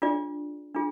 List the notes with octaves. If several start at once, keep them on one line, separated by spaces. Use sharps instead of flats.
D4 F4 G#4 D5
D4 F4 G#4